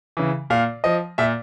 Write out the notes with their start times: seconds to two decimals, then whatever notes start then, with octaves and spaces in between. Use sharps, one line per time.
0.17 C#3 E3
0.50 A#2 F5
0.84 F3 D#5
1.18 A#2 E5